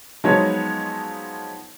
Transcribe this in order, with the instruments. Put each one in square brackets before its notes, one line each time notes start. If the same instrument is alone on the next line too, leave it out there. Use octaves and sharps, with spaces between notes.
[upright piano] F3 F#3 G#3 B3 D#4 C#5